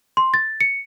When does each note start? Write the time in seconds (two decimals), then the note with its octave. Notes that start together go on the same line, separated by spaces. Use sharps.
0.17 C6
0.34 A6
0.61 C#7